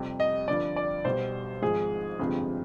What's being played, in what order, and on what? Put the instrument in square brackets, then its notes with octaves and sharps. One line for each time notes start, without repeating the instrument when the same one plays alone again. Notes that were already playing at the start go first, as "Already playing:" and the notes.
Already playing: [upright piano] F2 C3 G3
D#5
G1 G2 F3 D5
D5
B1 B2 G3 C5
G#1 G#2 F3 G#3 G#4
G1 F2 C3 F3 G#3